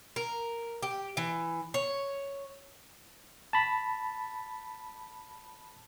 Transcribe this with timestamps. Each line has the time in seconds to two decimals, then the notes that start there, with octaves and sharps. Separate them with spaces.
0.16 A#4
0.82 G4
1.17 E3
1.74 C#5
3.53 A5 B5